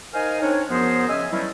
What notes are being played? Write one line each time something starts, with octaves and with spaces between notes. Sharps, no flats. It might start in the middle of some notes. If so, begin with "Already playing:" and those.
D#4 A#4 C5 F5 G#5
C4 D4 D#4 C#5
F#2 F3 B3 G#4 A#4 C5
C#3 C#4 D#5 E5 G#5
E3 F#3 G3 A3 C#4 E4